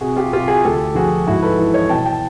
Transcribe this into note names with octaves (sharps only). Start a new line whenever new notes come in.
C3 F#4 G#4
F4 G4
C3 F4 G4
F#4 G#4
D2 G4 A4
F3 F#4 G#4
G#2 E4 F#4
A4 B4
E3
C#5 D#5
B2 G5 A5
G5 A5